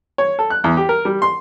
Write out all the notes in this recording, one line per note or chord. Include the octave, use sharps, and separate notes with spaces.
C#5
A4
F#6
E2
G4
A#4
G3
C6